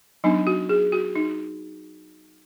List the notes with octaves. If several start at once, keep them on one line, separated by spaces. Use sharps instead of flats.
F#3 B3 D4 D#4
F#4
G#4
F#4
D#4